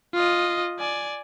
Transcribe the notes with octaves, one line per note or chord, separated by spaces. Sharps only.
F4 D#5
D5 G#5